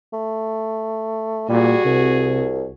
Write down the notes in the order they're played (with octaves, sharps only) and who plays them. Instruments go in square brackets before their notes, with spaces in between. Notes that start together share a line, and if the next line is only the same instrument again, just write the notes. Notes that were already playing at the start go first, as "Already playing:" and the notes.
[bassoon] A3
[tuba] A#2 [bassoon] G3 [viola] F#4 G#4
[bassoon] C2 [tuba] C3